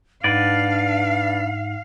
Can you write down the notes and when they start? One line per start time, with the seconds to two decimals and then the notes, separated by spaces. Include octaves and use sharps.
0.24 G#2 D4 D#4 B4 D5 F5 F#5